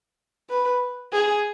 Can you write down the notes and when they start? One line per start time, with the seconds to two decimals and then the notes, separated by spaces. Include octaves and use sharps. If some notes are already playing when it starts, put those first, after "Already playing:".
0.50 B4
1.13 G#4